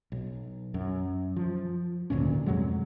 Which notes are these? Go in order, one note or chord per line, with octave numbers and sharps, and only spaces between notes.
B1
F#2
F3
G#1 D2 A#2 C#4
F2 C3 F#3 G#3